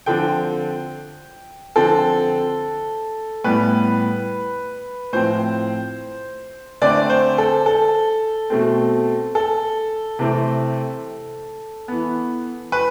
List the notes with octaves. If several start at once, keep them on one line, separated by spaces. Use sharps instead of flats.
D3 F3 C4 G5
D3 F3 C4 A4
A2 G3 B3 B4
A2 F3 C4 C5
D3 A3 C4 D5
C5
A4
A4
B2 A3 C4
A4
C3 E3 A3 C4
E3 B3
B4